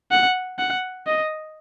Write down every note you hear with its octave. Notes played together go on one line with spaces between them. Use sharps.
F#5
F#5
D#5